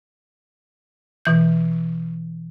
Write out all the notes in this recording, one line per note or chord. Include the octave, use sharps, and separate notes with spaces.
B2 E3 G6